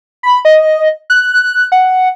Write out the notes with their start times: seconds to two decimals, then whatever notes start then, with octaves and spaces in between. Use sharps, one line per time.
0.23 B5
0.45 D#5
1.10 F#6
1.72 F#5